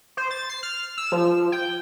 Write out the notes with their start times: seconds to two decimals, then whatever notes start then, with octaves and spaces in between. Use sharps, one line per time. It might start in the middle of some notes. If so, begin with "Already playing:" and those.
0.17 C5
0.31 A6
0.49 C7
0.63 F6
0.97 E6
1.12 F3
1.52 G5